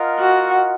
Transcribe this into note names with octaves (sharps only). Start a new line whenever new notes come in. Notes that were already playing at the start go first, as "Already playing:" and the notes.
Already playing: F4 A#4 D#5 F#5
F#4